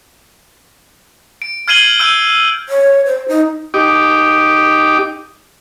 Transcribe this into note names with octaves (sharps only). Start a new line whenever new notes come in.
D7
F6 G#6 C7 D#7 F#7 G7
E6 G6 D#7
C#5
C5
D#4
D#4 G4 D6